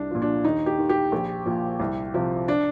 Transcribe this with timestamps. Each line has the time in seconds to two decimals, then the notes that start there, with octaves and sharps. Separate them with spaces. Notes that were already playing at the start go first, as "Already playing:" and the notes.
Already playing: C2 D4
0.11 A#2 F3
0.22 D4
0.44 D#2 D#4
0.66 G4
0.78 D#3
0.89 G4
1.12 A#1
1.46 A#2 F3
1.80 C2
2.14 C3 F3
2.48 D4